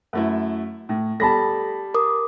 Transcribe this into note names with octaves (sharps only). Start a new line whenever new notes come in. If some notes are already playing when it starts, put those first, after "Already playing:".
F#2 A3 E4
A2
G3 A4 A5 B5 A#6
A#4 D6 D#6